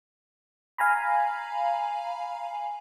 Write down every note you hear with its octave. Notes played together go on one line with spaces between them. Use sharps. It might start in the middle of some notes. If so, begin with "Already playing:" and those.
F5 G#5 A#5 B5